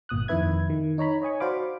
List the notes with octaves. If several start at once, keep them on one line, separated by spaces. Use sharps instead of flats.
G1 A#2 D#6 F#6
F2 D#3 E4 B4 E5 G#6
D#3
D#4 C#5 A#5 B5
C#5 D#5 G#5 C#6
F#4 C5 D5 F5 B5 D6